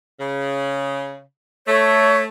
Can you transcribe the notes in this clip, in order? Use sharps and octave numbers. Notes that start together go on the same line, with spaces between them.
C#3
A3 C#5